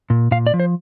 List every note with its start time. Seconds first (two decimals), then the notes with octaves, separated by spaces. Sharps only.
0.10 A#2
0.31 A#2 F5
0.47 D5
0.54 F3
0.60 C5